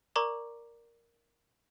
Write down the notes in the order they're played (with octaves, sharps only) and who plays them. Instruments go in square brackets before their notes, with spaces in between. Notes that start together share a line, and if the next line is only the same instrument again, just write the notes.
[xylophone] A#4 D5 A#5 C#6 D6